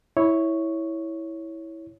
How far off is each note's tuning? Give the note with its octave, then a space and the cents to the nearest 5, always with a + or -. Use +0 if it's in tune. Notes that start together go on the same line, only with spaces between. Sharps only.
E4 -10 C#5 +0